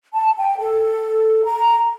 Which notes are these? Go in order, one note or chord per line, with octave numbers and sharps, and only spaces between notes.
A5
G5
A4
A#5